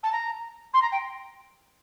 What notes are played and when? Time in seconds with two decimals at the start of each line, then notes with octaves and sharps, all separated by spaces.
0.03 A5
0.12 A#5
0.73 C6
0.81 A#5
0.91 G5